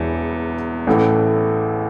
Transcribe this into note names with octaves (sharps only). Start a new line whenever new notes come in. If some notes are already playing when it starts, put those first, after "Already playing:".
Already playing: E1 E2 E3
A1 A2 E3 A3